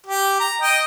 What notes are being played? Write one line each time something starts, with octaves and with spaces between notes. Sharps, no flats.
G4
A#5
D#5 G5